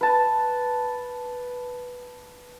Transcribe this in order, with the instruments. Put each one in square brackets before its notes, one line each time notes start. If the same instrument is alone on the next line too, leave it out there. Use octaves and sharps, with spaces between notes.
[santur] B4 A5